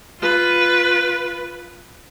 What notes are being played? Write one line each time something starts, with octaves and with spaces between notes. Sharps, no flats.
F4 B4